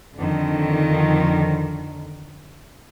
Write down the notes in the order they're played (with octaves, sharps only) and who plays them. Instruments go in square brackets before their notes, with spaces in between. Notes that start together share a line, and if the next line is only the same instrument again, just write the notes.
[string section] F2 D3 D#3